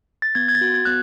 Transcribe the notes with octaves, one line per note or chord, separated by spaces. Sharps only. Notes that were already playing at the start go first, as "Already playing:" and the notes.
A6
B3 G#6
G#6
A6
F#4
G#6
B3 F#6